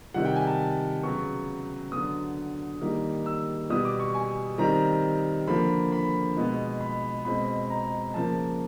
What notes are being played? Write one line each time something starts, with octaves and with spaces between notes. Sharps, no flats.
C3 D#3 G3 F#5
G5
G#5
A5
C#3 F#3 B3 C#6
D3 F#3 B3 D#6
D#3 G3 A#3
E6
B2 G3 B3 D#6
D6
C#6
G#5
D#3 G3 C4 A#5
D3 F3 A#3 B5
B5
B2 G#3 B3
B5
B2 G#3 C4 B5
A#5
C#3 F3 A#3 A5